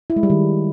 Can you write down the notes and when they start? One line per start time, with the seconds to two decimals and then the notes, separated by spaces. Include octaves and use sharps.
0.10 E4
0.16 G#3
0.23 G3
0.30 D#3